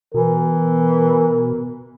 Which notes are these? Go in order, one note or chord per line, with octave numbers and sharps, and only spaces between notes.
B2 E3 A#4